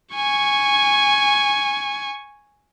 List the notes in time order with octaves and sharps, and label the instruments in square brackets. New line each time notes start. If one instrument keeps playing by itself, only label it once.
[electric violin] G#5 C#6